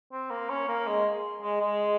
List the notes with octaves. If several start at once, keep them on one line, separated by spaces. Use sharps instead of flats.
C4
A#3
C#4
A#3
G#3
G#3
G#3